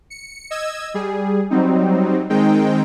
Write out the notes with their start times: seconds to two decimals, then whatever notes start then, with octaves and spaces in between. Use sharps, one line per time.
0.10 C#7
0.51 D#5 E6 G#6
0.94 G3 G#4
1.50 F#3 G3 C4 D#4
2.30 D#3 G#3 C4 D#4 G5